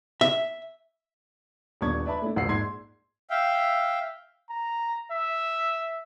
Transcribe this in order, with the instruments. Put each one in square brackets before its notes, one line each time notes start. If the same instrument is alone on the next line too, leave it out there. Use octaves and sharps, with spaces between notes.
[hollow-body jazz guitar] E5
[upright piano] D#1 B3 D4 C#6 G#6
B4 D5 E5 A5 B5
A3 D4 E4
E1 A#1 F#5 E6 C7
G#2 D5 C6 G#6 C7
[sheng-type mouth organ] E5 F5 G5
[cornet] A#5
E5